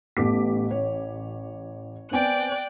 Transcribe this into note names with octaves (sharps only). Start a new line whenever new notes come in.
A1 A3 B3 G4 D6 B6
C#5
B3 C4 D5 G5 G#5 F#6